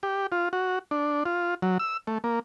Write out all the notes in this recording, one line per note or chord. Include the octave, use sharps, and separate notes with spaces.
G4
F4
F#4
D4
F4
F#3
E6
A3
A#3